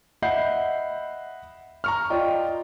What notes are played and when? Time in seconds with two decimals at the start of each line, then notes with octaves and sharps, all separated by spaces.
0.22 D#5 E5 F#5 B5 G6 C7
1.84 A#5 C#6 F6
2.10 F4 D5 D#5 G5